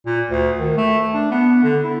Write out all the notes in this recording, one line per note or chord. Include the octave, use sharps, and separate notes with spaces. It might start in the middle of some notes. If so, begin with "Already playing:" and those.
A#2
D2
D#3
A3
D4
B3
D3
E4